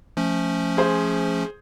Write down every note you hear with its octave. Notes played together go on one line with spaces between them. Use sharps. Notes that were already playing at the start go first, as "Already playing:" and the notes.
F3 A3 C#4
G#4 C5